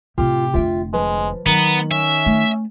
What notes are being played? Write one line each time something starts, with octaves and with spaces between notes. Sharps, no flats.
A2 C3 F4 G4
F1 D3 F4 E5 G5
F3 G#3 B4
D#3 F#3 B3 A#5
C#4 E5
A3